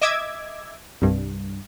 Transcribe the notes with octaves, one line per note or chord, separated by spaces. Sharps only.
D#5 E5 D6 E6 G#6
C2 G2